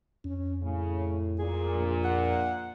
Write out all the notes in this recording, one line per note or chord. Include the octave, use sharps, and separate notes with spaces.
F2 C#4
A2 C#3
A#2 G#4
A#1
F#5